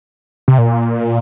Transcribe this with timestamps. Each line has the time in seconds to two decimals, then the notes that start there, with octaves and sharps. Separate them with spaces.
0.48 C3
0.58 A#2